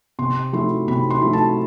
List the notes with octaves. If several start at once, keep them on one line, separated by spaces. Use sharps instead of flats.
C3 C6
F#3 A3 E4 C6
C3 B5
C6
F#3 A3 E4
A5